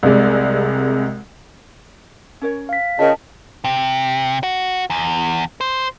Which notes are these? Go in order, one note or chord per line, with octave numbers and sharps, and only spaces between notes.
C2 C3 G#3 D5
C#4 A#4 C#5
F5 B6
C#3 F4 A#4 D#5 G5 A5
C3
F#4
E2
C5